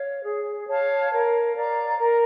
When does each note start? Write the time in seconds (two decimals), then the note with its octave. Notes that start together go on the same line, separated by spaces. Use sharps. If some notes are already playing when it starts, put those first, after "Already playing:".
Already playing: C#5 F5
0.24 G#4
0.68 C#5 F5 A5
1.12 A#4
1.56 D5 F5 A#5
1.99 A#4